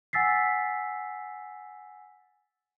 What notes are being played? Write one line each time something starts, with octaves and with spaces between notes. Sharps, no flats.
F#5 G#5 E6 A6 B6 C7